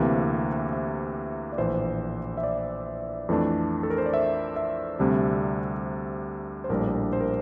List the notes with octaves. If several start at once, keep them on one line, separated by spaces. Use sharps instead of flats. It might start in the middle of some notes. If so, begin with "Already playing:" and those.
Already playing: D2 C3 E3 A#3 E5
E5
D5
A#1 A2 E3 C5
E5
D5
F2 E3 A3 D4
A4
A#4
C5
D5
E5
E5
D2 C3 G3 D4
C5
A#1 A2 G3 D4 A#4
C5
A#4